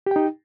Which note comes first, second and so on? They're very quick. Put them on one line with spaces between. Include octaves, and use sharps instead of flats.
G4 G5 D#4